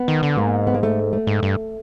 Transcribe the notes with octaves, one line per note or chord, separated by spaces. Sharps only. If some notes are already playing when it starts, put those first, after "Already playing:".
Already playing: B3
D#3
D3
G#2 A#3
B3
A#3
A3
A3
G#2
G2